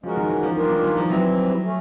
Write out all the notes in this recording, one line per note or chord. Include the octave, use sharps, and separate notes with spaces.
F3 G#3 C#4 F#4 A#4
D#3
E3
F3
E3 G3 A#3 D4 F4 A#4
D#3
E3
F3
E3 F#3 G3 C4 E4
A3 C#4